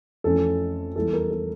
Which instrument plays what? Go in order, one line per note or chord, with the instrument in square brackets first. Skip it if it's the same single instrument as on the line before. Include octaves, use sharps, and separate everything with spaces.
[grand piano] F2 E3 A3 C#4 A4
E2 E3 G3 A4
A#4
A4